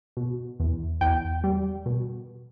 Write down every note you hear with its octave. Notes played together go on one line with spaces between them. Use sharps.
B2
E2
E2 G5
G3
B2